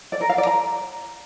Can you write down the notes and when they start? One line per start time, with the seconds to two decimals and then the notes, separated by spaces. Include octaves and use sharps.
0.12 D5
0.21 A#4
0.29 F5
0.38 D5
0.47 A#5